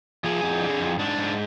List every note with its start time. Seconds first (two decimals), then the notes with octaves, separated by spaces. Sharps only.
0.24 F3 G#4
0.43 F2
0.61 D3
0.80 F2
0.99 G#2 D4
1.17 G#2